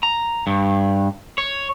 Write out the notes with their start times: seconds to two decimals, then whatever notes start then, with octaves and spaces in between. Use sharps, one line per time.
0.03 A#5
0.47 G2
1.38 C#5